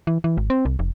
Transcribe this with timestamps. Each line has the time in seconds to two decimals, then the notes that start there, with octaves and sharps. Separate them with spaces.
0.07 E3
0.24 E3
0.37 G#1
0.50 C4
0.65 C2
0.79 F1